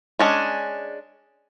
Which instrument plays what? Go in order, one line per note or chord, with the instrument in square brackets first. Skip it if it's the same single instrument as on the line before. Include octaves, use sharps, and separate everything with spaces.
[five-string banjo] G#3 C#4 D4